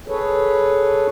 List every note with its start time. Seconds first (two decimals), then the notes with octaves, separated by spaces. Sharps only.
0.08 G#4 A4 B4 C#5